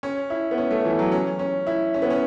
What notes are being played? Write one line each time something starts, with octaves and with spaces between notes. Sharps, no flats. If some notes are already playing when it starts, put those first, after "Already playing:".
C#4
E4
B3
C#4
A3
E3
F#3
C#4
C#4
E4
C#4
B3
C#4